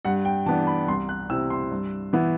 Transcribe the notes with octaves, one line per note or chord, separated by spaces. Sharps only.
G2 F#5
G5
E3 B3 D4 A5
B5
C2 C6
F#6
C3 G3 C4 E4 E6
C6
G2
E3 B3 E4